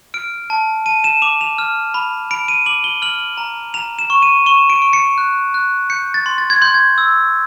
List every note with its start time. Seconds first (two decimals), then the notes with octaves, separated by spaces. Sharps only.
0.14 F6 D7
0.50 A5
0.86 A5 D#7
1.04 E7
1.22 D6 F7
1.41 F7
1.59 F6
1.94 B5
2.31 B5 D7
2.48 D#7
2.66 D6 F#7
2.84 G7
3.02 F6 F#7
3.38 A#5
3.74 A#5 F7
3.99 E7
4.10 C#6
4.22 D#7
4.46 C#6 E7
4.70 D7
4.82 C#6
4.93 C#7
5.18 F#6
5.54 F#6
5.90 G6 C#7
6.14 A6
6.26 C6
6.38 A6
6.50 G#6
6.62 C6 G6
6.74 G#6
6.98 E6